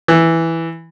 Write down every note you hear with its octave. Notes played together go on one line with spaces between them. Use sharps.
E3